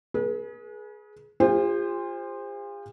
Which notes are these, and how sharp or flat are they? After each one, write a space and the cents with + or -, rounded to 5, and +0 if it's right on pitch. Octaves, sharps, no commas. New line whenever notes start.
G#4 +20 B4 -40
F4 +0 G#4 -45 C5 +0